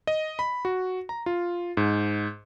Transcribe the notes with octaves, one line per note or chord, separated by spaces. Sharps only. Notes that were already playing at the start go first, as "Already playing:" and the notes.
D#5
B5
F#4
A#5
F4
G#2